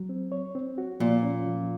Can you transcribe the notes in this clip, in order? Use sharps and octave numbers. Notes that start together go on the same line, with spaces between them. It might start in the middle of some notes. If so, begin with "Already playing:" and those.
Already playing: F#3
C4
C#5
C4
F#4
A#2 F3
C#4
F3